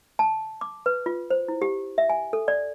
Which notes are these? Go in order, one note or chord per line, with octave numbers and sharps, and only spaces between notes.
A5
D6
B4
F4
C5
E4
G4
E5
G#5
A4
D5